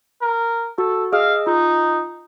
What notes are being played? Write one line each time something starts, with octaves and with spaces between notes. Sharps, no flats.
A#4
F#4 A4
G#4 D#5 F5 E6
D#4 F4